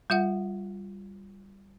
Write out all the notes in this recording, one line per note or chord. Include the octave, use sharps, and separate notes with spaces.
G3 F4 E5 F#5